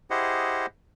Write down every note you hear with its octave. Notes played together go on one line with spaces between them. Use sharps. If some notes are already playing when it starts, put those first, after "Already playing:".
E4 G4 G#4 C5 D#5 F#5